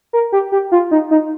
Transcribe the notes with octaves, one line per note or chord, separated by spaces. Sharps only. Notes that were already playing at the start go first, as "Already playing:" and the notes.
A#4
G4
G4
F4
D#4
D#4